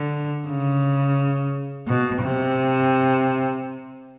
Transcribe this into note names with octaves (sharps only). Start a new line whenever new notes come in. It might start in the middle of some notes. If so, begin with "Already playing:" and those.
Already playing: D3
C#3
B2
C3